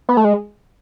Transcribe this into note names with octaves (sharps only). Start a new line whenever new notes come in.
B3
A3
G#3